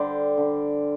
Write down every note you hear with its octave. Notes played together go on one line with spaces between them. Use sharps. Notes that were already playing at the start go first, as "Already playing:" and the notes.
Already playing: D3 G3 C5 D5
D3